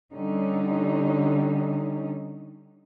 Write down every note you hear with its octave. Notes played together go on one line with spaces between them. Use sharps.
D3 G3 C#4 D#4